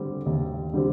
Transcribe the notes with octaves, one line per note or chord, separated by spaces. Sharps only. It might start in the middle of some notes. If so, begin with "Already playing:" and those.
Already playing: D3 G3 C4
D#2
D3 G3 C4